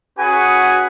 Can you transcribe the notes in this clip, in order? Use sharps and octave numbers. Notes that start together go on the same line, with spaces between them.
C#4 F#4 G#4 B4 F#5 G#5